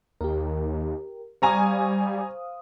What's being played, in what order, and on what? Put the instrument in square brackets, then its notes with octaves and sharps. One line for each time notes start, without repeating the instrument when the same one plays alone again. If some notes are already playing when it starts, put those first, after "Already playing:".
[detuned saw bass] D#2 [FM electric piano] G4 A#4
[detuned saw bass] G3 [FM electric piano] C5 F5 D#6 [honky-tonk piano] G#5 A#5 C#6